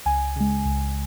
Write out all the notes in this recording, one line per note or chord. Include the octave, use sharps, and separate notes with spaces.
C#2 G#5
C#3 G#3
C#2